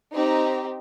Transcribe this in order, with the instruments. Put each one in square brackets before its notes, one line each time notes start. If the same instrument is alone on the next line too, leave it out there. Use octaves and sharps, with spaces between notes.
[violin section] C4 D#4 G4 A#5